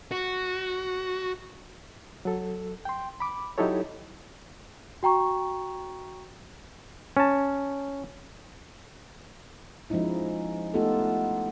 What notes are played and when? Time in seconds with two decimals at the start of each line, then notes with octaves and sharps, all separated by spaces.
0.11 F#4
2.25 F#3 A4
2.85 G5 C6
3.20 B5 D6
3.58 F#3 D#4 E4 G4 A4 C#5
5.03 F#4 G5 A#5 C#6
7.17 C#4 A5
9.90 F3 G#3 C#4 D#4 E4
10.74 A3 B3 D#4 F4 G4 A4